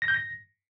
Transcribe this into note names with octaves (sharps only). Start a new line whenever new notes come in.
A#6
G6
A#6